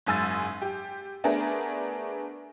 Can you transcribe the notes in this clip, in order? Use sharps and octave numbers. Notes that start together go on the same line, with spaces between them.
F#1 G#2 G#5 E6 A6
G4
A3 B3 D4 G#4 A#4